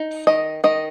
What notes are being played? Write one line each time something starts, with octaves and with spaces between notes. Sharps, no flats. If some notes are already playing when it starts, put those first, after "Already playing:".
Already playing: D#4
D#3 D#5
D#3 D#5